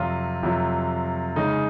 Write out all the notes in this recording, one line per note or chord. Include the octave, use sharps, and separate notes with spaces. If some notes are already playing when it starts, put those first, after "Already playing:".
Already playing: F2 C3 F#3 F4
F2 C3 F#3
C#3 G#3 C#4 D#4